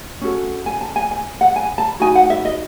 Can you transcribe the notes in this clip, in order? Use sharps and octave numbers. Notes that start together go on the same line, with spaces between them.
C#4 F#4 A4
G#5
A5
G#5
G#5
F#5
G#5
A5
D#4 F#4 G#5
F#5
E5
D#5